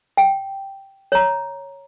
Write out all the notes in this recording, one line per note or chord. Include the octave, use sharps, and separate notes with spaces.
G5
C#5 A#5